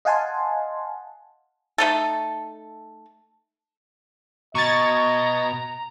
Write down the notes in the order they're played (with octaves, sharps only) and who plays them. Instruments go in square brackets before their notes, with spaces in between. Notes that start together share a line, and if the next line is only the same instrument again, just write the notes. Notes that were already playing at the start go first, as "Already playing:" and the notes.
[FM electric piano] D#5 F5 F#5 G#5 A5 C6
[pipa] A3 D#4 A4
[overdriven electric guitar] B2 [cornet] D#5 [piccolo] A#5 [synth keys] C#6 G#6 A6